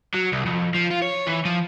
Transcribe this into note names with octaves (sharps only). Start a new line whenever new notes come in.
F#3
C2
F2
F3
F4
C#5
E3
F3